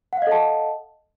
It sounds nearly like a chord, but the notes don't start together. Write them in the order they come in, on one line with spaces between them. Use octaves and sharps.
F#5 F5 D#5 A4 A5